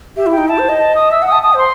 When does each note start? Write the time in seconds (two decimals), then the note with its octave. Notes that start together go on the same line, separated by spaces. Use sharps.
0.17 G4 E5
0.26 E4
0.32 G5
0.37 D#4
0.48 E4 A5
0.58 C5
0.69 D#5
0.79 A5
0.95 D#6
1.11 E5 E6
1.22 F#5 D#6
1.32 A5
1.43 A5 D#6
1.53 C5
1.58 C6